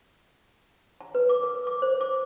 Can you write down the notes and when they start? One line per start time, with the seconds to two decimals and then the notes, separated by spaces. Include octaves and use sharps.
1.01 A#5
1.15 B4
1.29 D6
1.43 A#4
1.67 D6
1.82 C5
2.01 D6